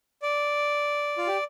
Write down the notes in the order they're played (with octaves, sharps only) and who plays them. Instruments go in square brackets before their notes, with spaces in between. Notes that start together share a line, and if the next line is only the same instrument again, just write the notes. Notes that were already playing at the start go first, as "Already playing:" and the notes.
[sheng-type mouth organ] D5
F4
G4